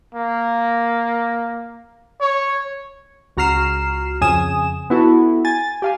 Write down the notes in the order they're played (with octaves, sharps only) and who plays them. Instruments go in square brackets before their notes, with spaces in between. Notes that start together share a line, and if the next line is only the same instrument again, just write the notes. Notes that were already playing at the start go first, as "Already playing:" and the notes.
[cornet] A#3
C#5
[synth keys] C#2 F#4 A#5 F6 C7 E7
F2 C#3 G#5 D#6 E7
B3 E4 F#4 A4
G#5 A6
G4 F5 G#5